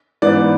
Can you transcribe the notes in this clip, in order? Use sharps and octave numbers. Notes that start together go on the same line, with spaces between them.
G#2 E3 B3 D5